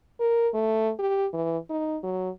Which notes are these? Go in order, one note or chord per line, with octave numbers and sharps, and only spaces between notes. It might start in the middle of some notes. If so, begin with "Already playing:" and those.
A#4
A3
G4
E3
D#4
F#3